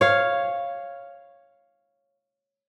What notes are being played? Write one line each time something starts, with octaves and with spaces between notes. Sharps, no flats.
C#5 F5